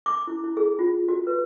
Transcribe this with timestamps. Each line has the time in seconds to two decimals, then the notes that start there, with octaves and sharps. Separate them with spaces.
0.06 D6
0.27 E4
0.44 E4
0.57 G#4
0.79 F4
1.08 F#4
1.27 B4